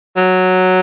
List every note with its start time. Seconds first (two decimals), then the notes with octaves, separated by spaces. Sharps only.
0.16 F#3